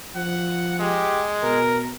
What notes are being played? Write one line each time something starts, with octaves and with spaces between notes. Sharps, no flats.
F3 F#5
G#3 G4
B2 A#4